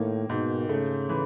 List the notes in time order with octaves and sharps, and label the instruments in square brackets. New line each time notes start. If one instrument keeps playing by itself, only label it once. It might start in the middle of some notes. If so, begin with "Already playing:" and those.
Already playing: [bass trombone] A2 [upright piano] D#3 A#3
[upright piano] G#2 [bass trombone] B2
[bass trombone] C#3 [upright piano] A3
[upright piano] E3